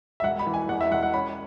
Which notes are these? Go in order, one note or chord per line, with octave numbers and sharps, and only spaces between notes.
E5
E1 F#5
B5
E3
G#5
E2 F#5
E5
E1 F#5
F#5
C#4 B5